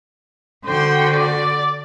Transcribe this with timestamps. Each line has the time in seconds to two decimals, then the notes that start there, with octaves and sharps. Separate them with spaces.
0.65 D3 F#4 C5 G5
1.14 D5